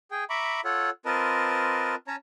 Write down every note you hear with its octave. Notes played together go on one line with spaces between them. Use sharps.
G#4 G5
E5 A#5 B5 C#6 D6
F4 A4 C#5 F#5
C4 F4 A#4 B4 D#5 A5
C#4 C#5 A5 A#5